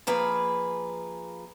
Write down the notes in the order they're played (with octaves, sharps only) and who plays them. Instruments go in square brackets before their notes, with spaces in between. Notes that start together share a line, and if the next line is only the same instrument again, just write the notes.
[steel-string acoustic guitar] F3 A#3 G#4 B4